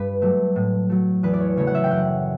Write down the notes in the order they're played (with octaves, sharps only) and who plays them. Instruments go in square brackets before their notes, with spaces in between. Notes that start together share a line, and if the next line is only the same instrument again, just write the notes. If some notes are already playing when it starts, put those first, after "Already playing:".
Already playing: [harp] G2 B4
F#3 A3
A2
F#3 A3
E2 B4
D5
C#5
C#3 F#3 A3 C#5
F#5
E5
G5
F#2 F#5